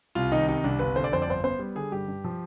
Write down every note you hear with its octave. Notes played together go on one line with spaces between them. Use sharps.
C2 F4
D#3 D#4
C3 D#4
C2 D4
G1 B4
D3 C5
D5
F2 C5
D5
G1 C5
B3 C5
G3
D3 G#4
G2 G4
G2
F3